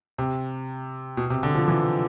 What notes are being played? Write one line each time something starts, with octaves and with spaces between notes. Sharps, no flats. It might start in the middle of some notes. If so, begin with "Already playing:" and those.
C3
B2
C3
D3
F3
E3